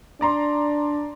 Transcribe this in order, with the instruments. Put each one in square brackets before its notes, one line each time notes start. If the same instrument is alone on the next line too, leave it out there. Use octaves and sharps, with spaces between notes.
[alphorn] D4 [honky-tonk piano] D5 A#5 C6